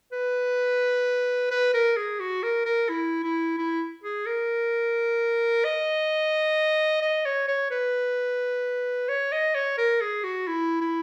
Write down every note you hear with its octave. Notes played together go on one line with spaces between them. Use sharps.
B4
B4
A#4
G#4
F#4
A#4
A#4
E4
E4
E4
G#4
A#4
D#5
D#5
C#5
C#5
B4
C#5
D#5
C#5
A#4
G#4
F#4
E4
E4